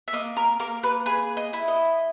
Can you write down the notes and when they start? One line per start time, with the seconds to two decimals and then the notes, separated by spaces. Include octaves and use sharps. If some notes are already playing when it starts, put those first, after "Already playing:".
0.08 E5
0.13 A#3 D#5
0.37 A#4
0.60 A#3 A#4
0.83 B4
1.06 G#4 B4
1.37 D#5
1.53 E4
1.68 D#5